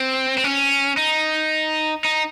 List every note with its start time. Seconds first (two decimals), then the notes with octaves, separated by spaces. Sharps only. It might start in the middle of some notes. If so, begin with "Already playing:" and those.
Already playing: C4
0.38 C4
0.44 C#4
0.97 D#4
2.05 D#4